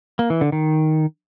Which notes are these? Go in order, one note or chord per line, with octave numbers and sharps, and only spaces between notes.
A#3
E3
D3
D#3